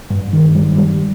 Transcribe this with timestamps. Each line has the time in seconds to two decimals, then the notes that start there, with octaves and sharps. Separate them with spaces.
0.10 G2
0.33 D#3
0.55 G3
0.78 G3